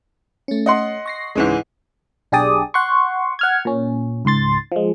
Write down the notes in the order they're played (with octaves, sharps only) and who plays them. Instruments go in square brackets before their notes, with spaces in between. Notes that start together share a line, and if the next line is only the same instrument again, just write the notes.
[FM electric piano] A3 C#4
[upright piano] D#5 F#5 C6
[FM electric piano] C#6 A#6 C7
[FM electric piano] C#2 C#3 [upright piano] G#2 E3 G#3
[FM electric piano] B1 D4 G4 G#4 D5 D#6
F#5 C6 C#6
F#5 F6 G#6
A#2 C#4
C#2 G#2 C6 A6
F3 G#3